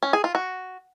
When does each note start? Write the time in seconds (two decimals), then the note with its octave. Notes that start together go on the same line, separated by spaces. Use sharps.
0.03 C#4
0.13 G#4
0.24 F4
0.35 F#4